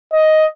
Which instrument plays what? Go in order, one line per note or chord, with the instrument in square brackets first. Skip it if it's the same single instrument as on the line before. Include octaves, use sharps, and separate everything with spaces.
[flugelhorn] D#5